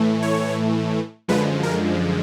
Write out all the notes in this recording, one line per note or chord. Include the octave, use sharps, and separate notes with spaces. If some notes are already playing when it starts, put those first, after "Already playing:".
Already playing: A2 E3 A3
C#5
F#2 D3 F3 G#3 B4
A#4